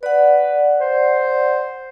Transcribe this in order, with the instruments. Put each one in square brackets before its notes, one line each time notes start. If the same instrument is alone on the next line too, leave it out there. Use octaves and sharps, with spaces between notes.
[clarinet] B4 [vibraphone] D5 F#5
[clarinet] C5